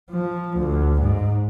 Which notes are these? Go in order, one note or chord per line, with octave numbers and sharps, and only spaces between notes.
F3
D2
G#2